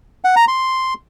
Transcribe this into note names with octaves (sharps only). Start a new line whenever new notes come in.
F#5
A#5
C6